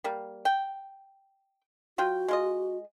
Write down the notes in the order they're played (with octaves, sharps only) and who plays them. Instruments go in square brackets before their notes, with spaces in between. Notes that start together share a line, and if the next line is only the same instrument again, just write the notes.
[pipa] G3 A#3
G5
[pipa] F#3 F4 G5 [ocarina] F#4
[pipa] G#3 F4 D#5